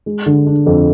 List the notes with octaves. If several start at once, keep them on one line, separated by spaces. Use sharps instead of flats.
G#3
D3
D4
F2